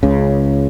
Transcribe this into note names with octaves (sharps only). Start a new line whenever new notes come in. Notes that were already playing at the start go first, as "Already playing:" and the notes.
C#2 C#3